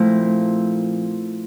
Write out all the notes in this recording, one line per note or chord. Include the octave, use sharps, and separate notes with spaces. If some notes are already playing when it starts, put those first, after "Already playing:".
Already playing: A#2 F3 A3 C4 E4